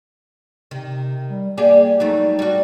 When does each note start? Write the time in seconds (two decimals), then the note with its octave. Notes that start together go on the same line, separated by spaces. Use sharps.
0.71 C3 D#3
1.29 G3
1.57 A#3 G4 G#4 D5
2.00 F#3 G3 A3 D#4
2.39 G3 F#4